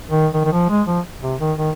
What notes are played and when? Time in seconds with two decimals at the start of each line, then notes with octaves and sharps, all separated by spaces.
0.11 D#3
0.34 D#3
0.45 D#3
0.52 F3
0.70 G#3
0.87 F3
1.23 C3
1.40 D#3
1.58 D#3